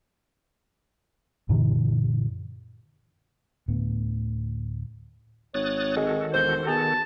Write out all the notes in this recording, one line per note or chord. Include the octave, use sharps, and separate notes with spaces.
F#2 A#2 D3 E3
D2 A2 D3 B3
G#1 C#5 D#6 F#6 A6
D#3 G#3 F#4 A4
E1 C5 G6
B2 G#4 A5